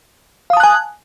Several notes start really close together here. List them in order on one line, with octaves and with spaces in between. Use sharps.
F5 D#6 A5 F#6 G#5